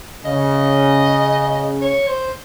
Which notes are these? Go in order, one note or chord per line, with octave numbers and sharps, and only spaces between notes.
C#3 D#5
C#5
C5